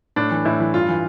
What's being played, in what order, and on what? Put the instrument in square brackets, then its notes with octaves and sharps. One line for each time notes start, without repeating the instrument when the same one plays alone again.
[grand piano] A2 D4
E3
A2 E4
E3
G2 F4
E3